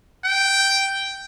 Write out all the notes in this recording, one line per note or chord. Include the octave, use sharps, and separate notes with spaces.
G5